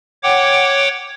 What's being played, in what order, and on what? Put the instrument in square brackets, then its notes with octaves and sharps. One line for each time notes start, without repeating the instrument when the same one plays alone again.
[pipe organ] C#5 F#5 G5 D6